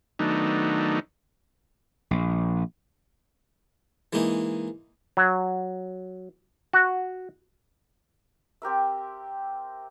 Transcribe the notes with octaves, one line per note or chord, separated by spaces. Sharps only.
D#3 F#3 A3 B3 D4 D#4
A#1
E3 G#3 A#3 D#4
F#3
F#4
C4 G4 A#4 E5